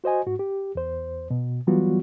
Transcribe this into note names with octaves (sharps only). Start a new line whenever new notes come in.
F#4 C5 D#5 G#5
G#2 F#4
G4
E2 C5
B2
E3 F#3 G3 B3 F4 F#4